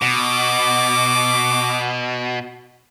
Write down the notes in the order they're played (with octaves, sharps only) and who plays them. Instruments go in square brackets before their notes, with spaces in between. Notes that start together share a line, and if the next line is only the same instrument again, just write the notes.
[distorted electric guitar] B2 [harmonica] D6